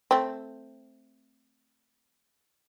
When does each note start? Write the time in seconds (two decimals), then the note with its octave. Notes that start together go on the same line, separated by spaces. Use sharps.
0.11 A3 C4